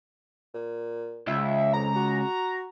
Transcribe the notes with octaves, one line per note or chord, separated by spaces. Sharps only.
A#2
C#2 E5
F2 A#5
F#4